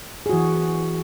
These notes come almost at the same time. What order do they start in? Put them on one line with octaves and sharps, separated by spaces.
G#4 F#4 E3